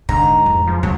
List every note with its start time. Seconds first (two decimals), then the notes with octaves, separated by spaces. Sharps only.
0.09 G#2 D3 A#5
0.46 F2
0.68 F3
0.83 C#2 F#3 G#3